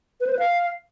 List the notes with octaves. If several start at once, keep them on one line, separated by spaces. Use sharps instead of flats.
B4
C5
B4
F5